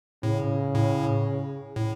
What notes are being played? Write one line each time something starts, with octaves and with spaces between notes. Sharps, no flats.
A2 C#3
A2
A2